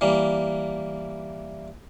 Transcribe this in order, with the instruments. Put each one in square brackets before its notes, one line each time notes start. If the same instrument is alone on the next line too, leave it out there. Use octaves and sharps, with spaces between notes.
[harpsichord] E3 G3 A#3